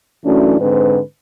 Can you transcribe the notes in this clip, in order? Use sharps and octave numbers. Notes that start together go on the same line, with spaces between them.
F#2 E3 A3 C#4 D4 F#4
G#2 D3 C4 B4